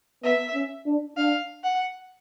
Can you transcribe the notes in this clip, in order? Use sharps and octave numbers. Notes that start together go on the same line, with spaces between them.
B3 E5
C#4
D4
D4 F5
F#5